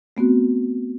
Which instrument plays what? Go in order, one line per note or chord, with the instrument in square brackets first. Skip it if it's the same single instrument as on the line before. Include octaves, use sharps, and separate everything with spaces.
[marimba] A3 B3 C4 F#4